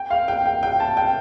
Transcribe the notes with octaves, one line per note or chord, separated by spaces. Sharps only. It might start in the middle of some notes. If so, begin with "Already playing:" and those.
Already playing: G5
F5
G5
G5
G5
A5
G5